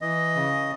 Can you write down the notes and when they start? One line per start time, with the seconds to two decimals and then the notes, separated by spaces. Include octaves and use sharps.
0.01 E3 D#5
0.36 C#3